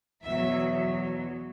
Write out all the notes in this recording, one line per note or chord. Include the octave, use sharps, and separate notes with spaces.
E2 B2 F#3 E5